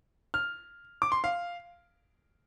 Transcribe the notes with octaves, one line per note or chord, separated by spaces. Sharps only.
F6
D6
C6
F5